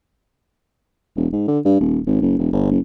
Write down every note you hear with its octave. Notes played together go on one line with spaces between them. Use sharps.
E1
G#2
D3
G2
D#1
G#1
F#1
E1
G1
F#1